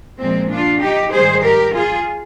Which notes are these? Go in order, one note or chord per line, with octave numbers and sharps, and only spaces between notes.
A#2 F3 G#3 C4
D4 F4
D#4 G4
G#2 D#3 G3 G#4 C5
G4 A#4
F4 G#4